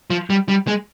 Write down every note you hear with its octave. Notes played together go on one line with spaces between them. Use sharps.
F3
G3
G3
G#3